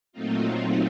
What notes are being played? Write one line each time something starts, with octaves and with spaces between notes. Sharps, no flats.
A#2 F#3 A3 C4 D#4 F4